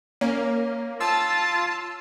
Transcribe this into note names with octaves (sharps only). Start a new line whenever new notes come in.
A#3 C#4
F4 A5 E6